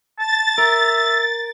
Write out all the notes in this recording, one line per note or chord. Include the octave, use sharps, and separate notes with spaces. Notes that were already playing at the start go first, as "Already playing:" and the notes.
A5 A6
A#4 E5